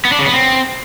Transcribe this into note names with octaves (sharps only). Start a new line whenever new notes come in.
B3
D4
C#3
B3
C4